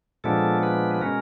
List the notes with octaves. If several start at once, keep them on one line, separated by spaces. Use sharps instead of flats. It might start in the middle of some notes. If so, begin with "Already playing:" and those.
A#2 F3 G#3 B3 D4 A4
B4
B4
B2 G#3 C#4 A#4